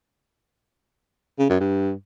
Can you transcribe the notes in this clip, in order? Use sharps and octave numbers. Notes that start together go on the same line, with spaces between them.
C#3
F#2
G2